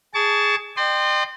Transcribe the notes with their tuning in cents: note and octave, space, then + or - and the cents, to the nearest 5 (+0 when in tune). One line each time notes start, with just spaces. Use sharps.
G#4 +0 A5 -5 C#6 +35
D#5 -45 G5 +0 C6 +0